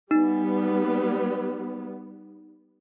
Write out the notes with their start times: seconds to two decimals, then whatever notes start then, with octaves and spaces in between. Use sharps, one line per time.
0.11 G3 B3 D#4